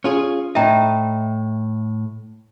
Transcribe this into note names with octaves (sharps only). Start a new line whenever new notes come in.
C#4 F4 G#4
A2 D#4 E5 G5 A#5